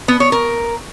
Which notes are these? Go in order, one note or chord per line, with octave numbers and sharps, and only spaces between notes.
B3
C#5
A#4